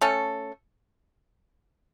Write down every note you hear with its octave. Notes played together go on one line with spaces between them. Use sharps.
A3 C#4 A4